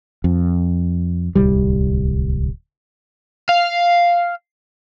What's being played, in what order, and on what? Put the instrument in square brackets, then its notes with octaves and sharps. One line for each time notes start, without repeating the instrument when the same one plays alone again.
[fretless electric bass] F2
D1 C2 G3
[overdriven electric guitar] F5